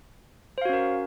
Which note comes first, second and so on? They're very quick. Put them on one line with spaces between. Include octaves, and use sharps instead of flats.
C5 F5 F#4 C#4 A#4